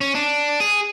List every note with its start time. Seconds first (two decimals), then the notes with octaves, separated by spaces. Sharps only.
0.01 C#4
0.15 D4
0.60 G#4